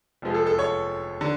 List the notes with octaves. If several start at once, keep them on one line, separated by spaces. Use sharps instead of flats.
F1 F2 F3 G#3
A4
A4
C#5
D3